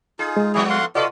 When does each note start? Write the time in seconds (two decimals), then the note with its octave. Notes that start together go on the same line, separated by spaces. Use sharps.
0.19 D#4 F4 G#4
0.37 G#3
0.54 A2 F3 B3 E4 G#4
0.70 F5 F#5 C6
0.95 F4 F#4 A4 B4 D5 D#5 C6